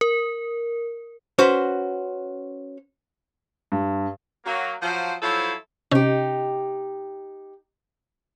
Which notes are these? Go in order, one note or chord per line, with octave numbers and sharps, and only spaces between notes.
A#4
C#4 F#4 B4 C5
G2
F#3 A#3
F3 F#3 C5
F3 F#3 E4 A4 C5 C#5
C3 C#4 D#4 G4